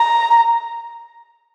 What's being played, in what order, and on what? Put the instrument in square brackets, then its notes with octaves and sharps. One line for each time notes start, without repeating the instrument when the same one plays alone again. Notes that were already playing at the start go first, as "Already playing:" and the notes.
Already playing: [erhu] A#5